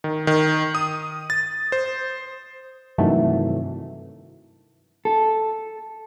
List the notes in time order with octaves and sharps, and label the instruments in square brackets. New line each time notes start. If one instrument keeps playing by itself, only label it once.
[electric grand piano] D#3
D#3
D#6
A6
C5
[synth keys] G2 C3 D#3 E3 F#3 A3
[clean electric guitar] A4